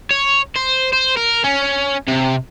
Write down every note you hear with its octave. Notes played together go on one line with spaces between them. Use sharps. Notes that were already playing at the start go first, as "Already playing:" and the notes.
C#5
C5
C5
A#4
C#4
C3